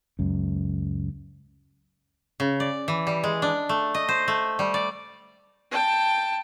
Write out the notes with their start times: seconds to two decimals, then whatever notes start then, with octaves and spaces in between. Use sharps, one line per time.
0.19 C#2 F#2
2.40 C#3
2.60 D5
2.88 E3
3.07 G3
3.24 G#3
3.42 D4
3.69 A3
3.94 D#5
4.08 C5
4.28 A3
4.59 G3
4.74 D5
5.71 G5 A5